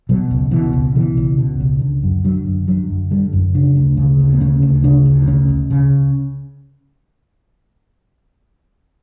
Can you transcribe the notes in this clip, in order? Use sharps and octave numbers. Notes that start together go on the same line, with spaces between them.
B2 F#3
C#2
B2 E3
C#2
B2 E3
C#2
B2
C#2
D3
F#2
D3 F#3
F#2
D3 F#3
F#2
D3 G3
F#2
C#3 D4
D2
C#3
D2
B3
C#3 C#4
D2
C#3 D4
D2
D4
C#3 C#4
C#2
C#3